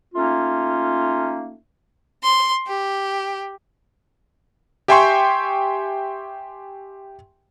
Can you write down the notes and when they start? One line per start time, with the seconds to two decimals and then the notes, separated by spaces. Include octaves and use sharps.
0.15 A3 A#3 C#4 D#4 F4
2.24 C6
2.67 G4
4.88 G4 E5 G5 G#5 C6 C#6